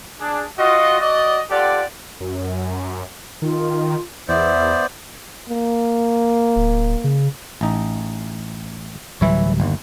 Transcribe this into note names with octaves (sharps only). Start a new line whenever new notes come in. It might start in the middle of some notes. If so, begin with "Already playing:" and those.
D4 G#4
F4 F#4 D#5
F#4 D5 D#5
C4 F4 G4 A4 D5 F#5
F#2
D#3 F4
E2 B3 C5 D5 E5
A#3
D1
C#3
A1 D#4
D1 E3 F#3 G3 E4 C#5
G1 D#2